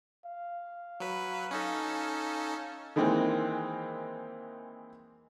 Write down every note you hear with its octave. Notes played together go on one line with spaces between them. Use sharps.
F5
F#3 B4
C#4 D#4 A4
D#3 E3 G#3 A#3 C4